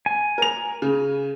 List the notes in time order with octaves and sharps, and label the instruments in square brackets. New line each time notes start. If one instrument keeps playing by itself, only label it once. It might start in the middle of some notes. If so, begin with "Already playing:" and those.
[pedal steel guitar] G#5
[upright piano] A#4 F7
C#3